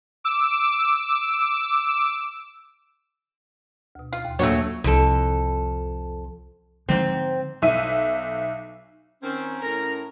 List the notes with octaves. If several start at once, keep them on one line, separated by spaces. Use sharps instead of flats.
D6 E6
D2 B2
F4
D#2
A#2 F#3 A3 D4 F#4 C#5
C2 F2 A4
G#2 D3 F3 G#3 C4
B1 E5 D#7
D#3 C4 C#4
A2 A#4 A#5